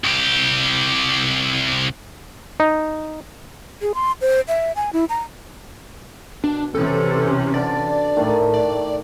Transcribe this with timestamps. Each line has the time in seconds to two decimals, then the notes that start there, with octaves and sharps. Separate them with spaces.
0.04 C2 G4
2.60 D#4
3.82 G#4
3.95 C6
4.21 C5
4.48 E5
4.76 G#5
4.93 E4
5.09 A#5
6.44 B2 D4
6.75 C3 E3 C#4 A4
7.06 B4
7.54 D3 D5
8.16 A2 D#3 A3 D4
8.54 D5